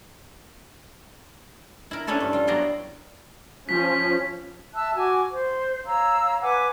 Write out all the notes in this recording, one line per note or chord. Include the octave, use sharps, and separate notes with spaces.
E4 A#4
C#4 D4 E4 A4 C#5 A5
G2
G3 F4
F#3 B3 E4 D5 A#5 C6
F3 C#4 B6
E5 A5 E6 F#6
F#4 G#5 D6
C5
C#5 F5 A#5 E6
B4 F#5 G#5 D6